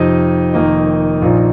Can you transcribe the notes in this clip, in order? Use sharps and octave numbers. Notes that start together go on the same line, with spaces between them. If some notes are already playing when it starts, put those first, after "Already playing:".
Already playing: F2 C3 F3 D#4 D#5
F1 F2 D#3 A#3 D#4 D#5
A#1 A#2 F3 D#4